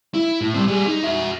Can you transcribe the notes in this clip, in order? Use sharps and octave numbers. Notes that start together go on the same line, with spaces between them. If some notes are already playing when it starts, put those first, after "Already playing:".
E4
A2
G3 C4
G3 G#4
D#4
F#4 E5